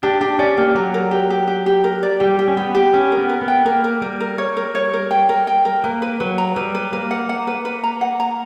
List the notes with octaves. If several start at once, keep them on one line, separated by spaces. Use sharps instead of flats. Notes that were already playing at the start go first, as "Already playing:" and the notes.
D4 G4
D4 G4
C#4 D5
A#3 G4
F#3 A#4
A#4
G4
G4
G4
G4
A#4
D5
G3 G4
G4
C#4
B3 G4
G4
C#4 G5
A#4
B3
A#4
B3
G5
A#3 A#4
A#4
G3 A#4
A#4
C#5
A#4
C#5
A#4
G5
A#4
G5
A#4
A#3 B4
B4
F#3 B4
A#5
G3 B4
B4
A#3 B4
F#5
F#5
B4
B4
A#5
F#5
A#5